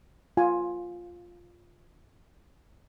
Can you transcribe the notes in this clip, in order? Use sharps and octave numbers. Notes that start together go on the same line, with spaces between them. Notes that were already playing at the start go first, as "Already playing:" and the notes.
F4 G#5